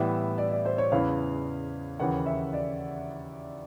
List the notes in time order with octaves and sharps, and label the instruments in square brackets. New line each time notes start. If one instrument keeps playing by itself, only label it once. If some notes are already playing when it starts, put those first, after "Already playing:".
Already playing: [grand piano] A2 E3 G3 B3 [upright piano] E5
[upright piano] D5
D5
C5
C#5
[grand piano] E2 C#3 E3 [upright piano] F5
[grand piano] D#2 C#3 E3 [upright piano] F#5
[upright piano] E5
D5